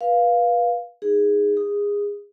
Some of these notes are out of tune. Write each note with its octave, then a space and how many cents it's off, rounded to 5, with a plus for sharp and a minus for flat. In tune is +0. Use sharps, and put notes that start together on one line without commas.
B4 -25 F5 +0
D#4 +0 G#4 -10
G#4 -25 D#6 +0